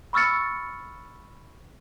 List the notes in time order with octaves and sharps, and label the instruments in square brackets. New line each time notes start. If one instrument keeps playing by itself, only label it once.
[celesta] B5 C#6 E6 F6 A6 C#7